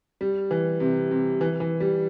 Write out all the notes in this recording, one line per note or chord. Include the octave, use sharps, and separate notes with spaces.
G3
E3
C3
C3
E3
E3
G3